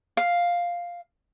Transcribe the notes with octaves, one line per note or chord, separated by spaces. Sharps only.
F5